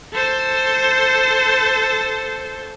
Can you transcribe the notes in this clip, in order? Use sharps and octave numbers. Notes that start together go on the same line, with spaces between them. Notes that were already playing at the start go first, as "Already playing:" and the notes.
A4 C5